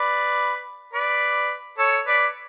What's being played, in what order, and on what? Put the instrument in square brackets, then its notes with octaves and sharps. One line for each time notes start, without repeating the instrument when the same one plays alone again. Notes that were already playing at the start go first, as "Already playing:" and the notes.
Already playing: [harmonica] B4 D5
B4 D5
A4 C#5
B4 D5